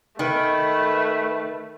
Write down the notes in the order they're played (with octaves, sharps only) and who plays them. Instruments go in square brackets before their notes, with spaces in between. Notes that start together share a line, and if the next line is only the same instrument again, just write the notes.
[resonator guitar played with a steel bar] D#3 [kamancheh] A3 [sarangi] B4